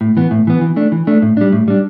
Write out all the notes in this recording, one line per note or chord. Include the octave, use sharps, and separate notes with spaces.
A2
E3 B3
A2
E3 B3
E3
A3 D4
E3
A3 D4
A2
G3 D4
A2
G3 D4